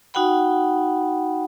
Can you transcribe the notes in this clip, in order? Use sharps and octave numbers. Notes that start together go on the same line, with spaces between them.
D#4 F#4 F#5 G5 B5